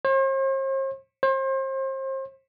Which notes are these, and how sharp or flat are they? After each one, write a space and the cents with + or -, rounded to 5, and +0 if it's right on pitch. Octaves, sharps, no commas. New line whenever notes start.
C5 +45
C5 +35